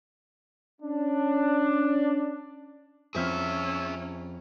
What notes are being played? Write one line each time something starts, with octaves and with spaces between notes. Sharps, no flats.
C#4 D4
F2 C4 C#4 G#4 E5 E6 F6